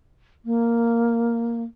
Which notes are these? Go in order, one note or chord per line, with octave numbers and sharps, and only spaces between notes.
A#3